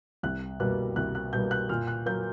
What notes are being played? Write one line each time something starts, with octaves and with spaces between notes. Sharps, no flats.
C2 F#6
B2 G3 A#3 F#6
C2 F#6
F#6
B2 G3 A#3 G6
F#6
A#2 F6
F#6
F#3 A#3 G6